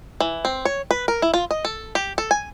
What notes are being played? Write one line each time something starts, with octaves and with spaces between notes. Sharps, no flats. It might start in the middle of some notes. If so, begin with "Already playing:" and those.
E3
C4
C#5
B4
A#4
E4
F4
D#5
A4
G4
A4
G#5